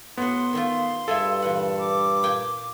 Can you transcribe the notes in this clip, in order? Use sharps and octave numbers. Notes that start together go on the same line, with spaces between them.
A2 B3 F#4 C6
D#3 A3 F4
G2 F4 G#4 A4 E5
A#2 E3 F#5
D6
A#2 G5 G#5